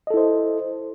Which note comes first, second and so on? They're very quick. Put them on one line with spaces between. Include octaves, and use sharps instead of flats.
D#5 A4 E4 C5